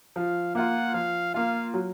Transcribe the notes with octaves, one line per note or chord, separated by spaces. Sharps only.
F3 F5
A#3 F4 F#5
F3 F5
A#3 F4 F5
F#3